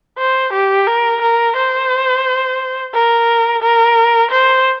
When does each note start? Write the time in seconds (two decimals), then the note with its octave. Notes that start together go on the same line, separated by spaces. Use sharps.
0.18 C5
0.53 G4
0.87 A#4
1.21 A#4
1.56 C5
2.94 A#4
3.62 A#4
4.31 C5